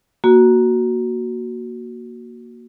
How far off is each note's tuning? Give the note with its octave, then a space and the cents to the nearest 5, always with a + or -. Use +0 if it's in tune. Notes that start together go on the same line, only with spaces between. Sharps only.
A#3 +10 F#4 +0